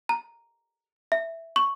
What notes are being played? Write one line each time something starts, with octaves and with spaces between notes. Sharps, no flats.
A#5
E5
C#6